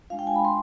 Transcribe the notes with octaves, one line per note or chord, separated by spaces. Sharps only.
G#3 D4 F4 F5
G5
G#5
B5
C6